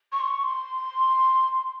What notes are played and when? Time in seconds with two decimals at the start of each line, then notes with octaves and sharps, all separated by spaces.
0.12 C#6
0.19 C6
0.27 C#6
0.43 C6